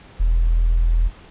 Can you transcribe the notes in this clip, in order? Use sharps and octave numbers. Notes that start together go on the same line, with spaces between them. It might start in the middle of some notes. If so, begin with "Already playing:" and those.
E1